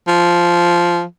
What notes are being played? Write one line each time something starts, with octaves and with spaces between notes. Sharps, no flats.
F3